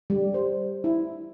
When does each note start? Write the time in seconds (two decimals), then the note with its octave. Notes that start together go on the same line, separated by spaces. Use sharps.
0.10 G3
0.34 C5
0.84 E4